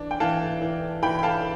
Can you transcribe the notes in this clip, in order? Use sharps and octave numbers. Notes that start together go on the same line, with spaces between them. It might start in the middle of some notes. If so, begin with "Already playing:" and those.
Already playing: E3 D4
G5
E3 F5 A5
E3
E3 G5 B5
B5
F5 A5